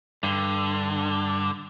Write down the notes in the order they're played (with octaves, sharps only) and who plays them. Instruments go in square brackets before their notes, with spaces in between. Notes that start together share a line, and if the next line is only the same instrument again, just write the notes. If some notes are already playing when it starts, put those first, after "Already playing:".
[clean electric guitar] G2 [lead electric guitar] D3